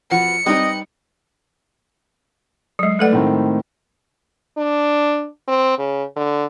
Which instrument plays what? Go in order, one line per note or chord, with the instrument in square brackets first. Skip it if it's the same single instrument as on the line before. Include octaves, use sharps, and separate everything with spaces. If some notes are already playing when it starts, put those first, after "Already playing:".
[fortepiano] F3 [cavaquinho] F#4 B4 [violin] C#7
[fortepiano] G3 C4 D#4 [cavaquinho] B4 G5 D#6 [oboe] D#5
[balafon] F#3 G#3
[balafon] A3 A4 F#5 [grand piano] B4 D5
[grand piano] A2 D#3 C4
[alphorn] D4
C4
C#3
D3